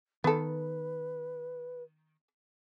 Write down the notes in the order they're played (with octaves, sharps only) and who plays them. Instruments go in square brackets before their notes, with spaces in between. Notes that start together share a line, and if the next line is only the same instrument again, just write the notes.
[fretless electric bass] D#3 [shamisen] B3 A4 [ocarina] B4